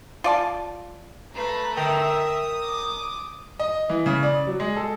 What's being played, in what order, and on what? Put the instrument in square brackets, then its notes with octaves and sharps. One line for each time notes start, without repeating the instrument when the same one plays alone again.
[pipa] F4 D5 A5
[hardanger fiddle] A3 B4 [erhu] A#5
[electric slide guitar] A#4 G5 [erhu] E5 [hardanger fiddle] D#6
[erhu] D6
[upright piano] D#5
E3
C#3
D5
F#3
G#3
A4